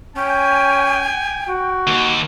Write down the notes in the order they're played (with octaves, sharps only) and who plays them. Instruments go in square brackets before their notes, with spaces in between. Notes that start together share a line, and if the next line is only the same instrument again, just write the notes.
[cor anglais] C#4 [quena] G5 [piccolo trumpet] G#5
[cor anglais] F#4
[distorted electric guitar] D#2